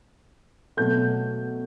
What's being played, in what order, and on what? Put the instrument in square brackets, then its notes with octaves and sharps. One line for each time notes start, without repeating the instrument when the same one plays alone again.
[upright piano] B2 F#3 A3 G6